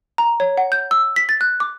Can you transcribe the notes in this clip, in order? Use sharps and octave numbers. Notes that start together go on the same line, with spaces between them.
A#5
C#5
F#5
G6
E6
B6
A6
F#6
D6